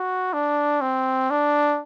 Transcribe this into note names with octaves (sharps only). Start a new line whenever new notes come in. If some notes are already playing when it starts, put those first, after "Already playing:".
Already playing: F#4
D4
C4
D4